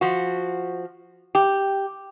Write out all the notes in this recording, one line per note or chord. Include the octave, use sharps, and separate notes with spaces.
F3 F#4
G4